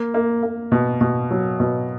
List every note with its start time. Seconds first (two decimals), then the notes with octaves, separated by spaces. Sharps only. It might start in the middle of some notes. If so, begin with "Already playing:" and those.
Already playing: A#3
0.14 A#3
0.43 A#3
0.72 B2
1.01 B2
1.31 F#3
1.60 B2